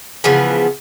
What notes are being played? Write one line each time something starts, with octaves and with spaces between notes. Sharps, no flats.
C#3 E3 F3 B3